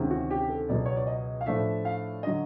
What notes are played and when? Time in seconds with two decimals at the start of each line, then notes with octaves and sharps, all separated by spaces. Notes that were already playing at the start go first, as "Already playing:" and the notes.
Already playing: D2 C3 D#3 G#3 C#4
0.11 F#4
0.30 G4
0.49 A4
0.69 C#2 B2 F#3 D5
0.86 C#5
0.96 D5
1.07 D#5
1.41 F5
1.46 A2 F3 A3 D4 E5
1.85 F5
2.23 D3 F#3 D#5